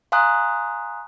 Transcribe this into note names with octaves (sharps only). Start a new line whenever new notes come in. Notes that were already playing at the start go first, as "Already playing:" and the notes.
F5 G#5 A#5 C6 D#6 F#6